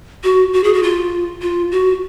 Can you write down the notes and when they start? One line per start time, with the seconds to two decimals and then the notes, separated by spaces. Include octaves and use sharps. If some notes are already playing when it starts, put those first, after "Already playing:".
0.24 F#4
0.53 F#4
0.64 G#4
0.74 F#4
0.83 F4
1.42 F4
1.72 F#4